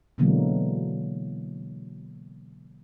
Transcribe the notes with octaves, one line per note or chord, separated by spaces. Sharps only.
B2 D3 E3 F#3 G#3 A#3